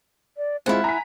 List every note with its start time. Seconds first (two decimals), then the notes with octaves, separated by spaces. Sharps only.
0.37 D5
0.66 G#3 C4 E4 F4 F#5
0.84 G#5 A#5 B6